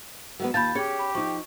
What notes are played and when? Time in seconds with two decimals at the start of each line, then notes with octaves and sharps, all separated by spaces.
0.40 F#3 G#3 B3
0.54 D#2 F4 A5 B5 G6 A6
0.75 C#4 G4 G#4 G#6 C#7
0.99 B5
1.15 F3 D#4 C#6